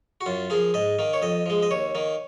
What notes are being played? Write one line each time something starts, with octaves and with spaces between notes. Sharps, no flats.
F#4
F#2 F4
F3 A#3 G#4
G#2 D#5
D#3 A#3
C#5
F2 D#5
F3 G#3
D#5
D#2 C#5
D#3 A#3